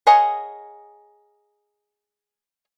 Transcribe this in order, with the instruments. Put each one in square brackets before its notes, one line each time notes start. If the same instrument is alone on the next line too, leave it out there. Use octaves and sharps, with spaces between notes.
[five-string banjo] G#4 A#4 C#5 D#5 F#5